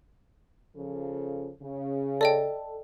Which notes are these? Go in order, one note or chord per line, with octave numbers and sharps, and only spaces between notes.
C#3 F3 A4
C#3
A4 D5 D#5 G5